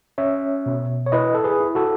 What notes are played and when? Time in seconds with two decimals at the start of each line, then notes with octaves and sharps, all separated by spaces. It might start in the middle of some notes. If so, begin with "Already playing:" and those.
0.18 C#4 C#5 E5
0.66 B2
1.06 C#5
1.12 E4 B4 D#5
1.35 A4
1.44 G#4 B4
1.60 E4
1.75 F#4 A4